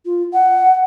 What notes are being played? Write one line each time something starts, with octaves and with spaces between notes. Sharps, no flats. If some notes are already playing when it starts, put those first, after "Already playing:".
F4
F#5